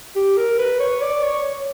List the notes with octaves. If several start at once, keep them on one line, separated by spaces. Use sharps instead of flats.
G4
A#4
B4
C#5
D5
C#5